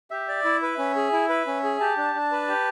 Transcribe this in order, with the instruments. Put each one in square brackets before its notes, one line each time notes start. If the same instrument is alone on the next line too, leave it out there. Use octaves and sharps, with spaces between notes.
[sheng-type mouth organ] G4 [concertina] E5
[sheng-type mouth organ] D5
E4
B4
C#4
G#4
E4
B4
C#4
G#4
[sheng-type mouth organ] G4 [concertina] A5
[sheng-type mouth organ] D4
D4
B4
G4